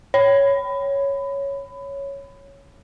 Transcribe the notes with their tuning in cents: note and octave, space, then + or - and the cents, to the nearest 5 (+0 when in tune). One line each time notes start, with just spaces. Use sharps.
C#5 +0 B5 +20